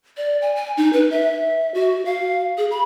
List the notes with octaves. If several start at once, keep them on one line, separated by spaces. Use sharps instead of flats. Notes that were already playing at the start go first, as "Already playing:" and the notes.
D5
G#5
G#5
D#4
B4
E5
F#4
F5
G#4
B5